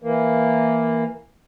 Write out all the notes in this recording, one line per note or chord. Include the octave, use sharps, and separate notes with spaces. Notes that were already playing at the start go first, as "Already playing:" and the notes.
E3 A#3